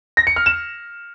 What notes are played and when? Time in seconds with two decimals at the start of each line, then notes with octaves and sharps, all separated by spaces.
0.17 A#6
0.27 C#7
0.36 F6
0.46 E7